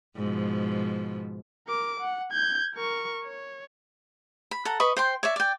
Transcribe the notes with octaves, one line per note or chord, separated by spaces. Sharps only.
G#2 B2 F3
A#4 D6
F#5
G6 G#6
A#4 C#6
C#5
B5
A4 F#5 A#5
B4 D#5 B5 C#6
C5 G5 C6
C#5 D5 E5
D5 G5